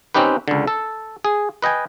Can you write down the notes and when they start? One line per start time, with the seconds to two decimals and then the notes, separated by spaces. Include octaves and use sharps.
0.14 C4 C#4 D#4 G4 B4
0.48 C#2 D3
0.67 A4
1.25 G#4
1.62 B4 D#5 G5 G#5